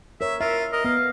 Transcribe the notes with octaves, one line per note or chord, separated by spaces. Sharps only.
A#4 C#5 E5
F4 A#4 E5
A#4 D#5
B3 F5